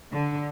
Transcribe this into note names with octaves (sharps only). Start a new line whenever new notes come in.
D3